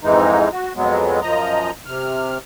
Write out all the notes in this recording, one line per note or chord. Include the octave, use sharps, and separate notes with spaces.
F2 G#2 E3 G#3 D#4
F#4
F2 F#3 G#3 B3
F#2 F3 D#5 A#5
C3 F6